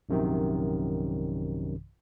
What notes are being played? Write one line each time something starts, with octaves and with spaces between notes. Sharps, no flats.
A#1 F#2 C3 D#3